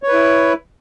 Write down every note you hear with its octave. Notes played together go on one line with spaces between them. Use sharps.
E4 B4 C#5